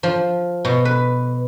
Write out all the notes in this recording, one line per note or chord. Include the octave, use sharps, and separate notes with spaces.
F3
B2
B4